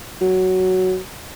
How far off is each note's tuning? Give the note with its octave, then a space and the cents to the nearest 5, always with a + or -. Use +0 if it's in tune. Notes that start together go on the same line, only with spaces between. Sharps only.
F#3 +5